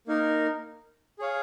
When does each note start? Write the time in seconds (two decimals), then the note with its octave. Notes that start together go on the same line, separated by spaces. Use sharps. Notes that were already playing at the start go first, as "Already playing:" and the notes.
0.07 A#3 D#4 A#4
1.19 G#4 C#5 F5